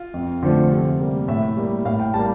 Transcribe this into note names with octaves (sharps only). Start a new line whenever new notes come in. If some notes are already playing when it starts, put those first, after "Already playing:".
Already playing: F4
F2
D3 F3 A3
C3
G3 A#3
A2 E5
G3 A#3
A2 F5
G5
G3 A#3 A5